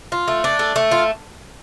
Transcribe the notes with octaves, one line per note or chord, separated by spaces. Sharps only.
F4
A3
D4
A3
A3
F4